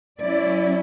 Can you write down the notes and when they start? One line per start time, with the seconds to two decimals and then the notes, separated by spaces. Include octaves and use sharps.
0.20 F#3 C#4 E4 D5